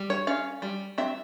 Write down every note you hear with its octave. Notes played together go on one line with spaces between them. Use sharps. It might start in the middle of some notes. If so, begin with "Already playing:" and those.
Already playing: G3
C#5
C#4 F5
G3
C4 E5